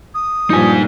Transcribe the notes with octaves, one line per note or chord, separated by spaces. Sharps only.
D#6
G2 A#2 F3 D#4 G#5